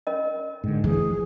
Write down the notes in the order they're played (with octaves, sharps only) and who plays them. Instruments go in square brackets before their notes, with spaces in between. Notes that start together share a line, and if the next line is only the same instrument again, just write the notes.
[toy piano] C#4 A#4 D#5
[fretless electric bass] G#2 D3
[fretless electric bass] E3 [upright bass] F3 [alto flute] G#4